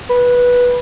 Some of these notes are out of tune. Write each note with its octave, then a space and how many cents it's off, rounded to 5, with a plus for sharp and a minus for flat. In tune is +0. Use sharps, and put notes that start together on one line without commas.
B4 -10